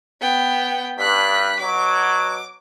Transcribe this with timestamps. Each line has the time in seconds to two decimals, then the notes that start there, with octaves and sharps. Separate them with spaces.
0.21 B3 G5
0.99 G2 F#6 B6
1.60 B2 F#3 D6